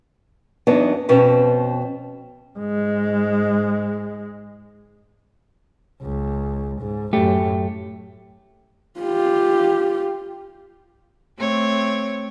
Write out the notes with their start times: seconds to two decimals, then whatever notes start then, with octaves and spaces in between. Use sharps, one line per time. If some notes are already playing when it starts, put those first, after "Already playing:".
0.67 E2 F#3 B3 D4 D#4
1.09 F2 B2 C4 C#4 B4
2.59 G#2 G#3
6.02 C#2
6.81 G#2
7.13 F#2 A2 A3 G4
9.00 F4 G4
11.38 A3 C4 C#5